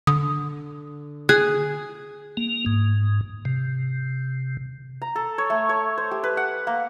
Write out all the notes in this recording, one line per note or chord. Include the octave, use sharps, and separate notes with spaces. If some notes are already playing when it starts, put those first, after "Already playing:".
D3 D#6
G#4 F#6
A#3
G#2
C3
A#5
A4
C#5
A3
C#5
C5
G4
B4
F#5
A#3